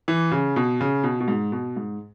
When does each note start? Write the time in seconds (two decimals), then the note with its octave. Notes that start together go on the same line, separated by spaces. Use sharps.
0.08 E3
0.32 C#3
0.56 B2
0.81 C#3
1.03 B2
1.20 B2
1.28 G#2
1.52 B2
1.77 G#2